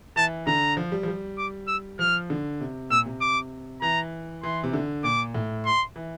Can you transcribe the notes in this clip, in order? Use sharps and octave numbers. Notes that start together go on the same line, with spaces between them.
E3 A5
D3 A#5
F3
G3
F3
G3
D6
E6
F3 F6
D3
C3
A#2 E6
C3
D6
E3 A#5
E3 C6
C3
D3
A#2 D6
A2
C6
E3